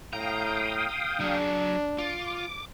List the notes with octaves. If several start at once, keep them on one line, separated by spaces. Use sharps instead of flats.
A2 F5 G5 A#5 D#6
F#3 D4 G#4
F4 D6